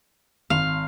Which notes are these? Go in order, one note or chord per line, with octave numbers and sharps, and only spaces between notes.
G#1 F5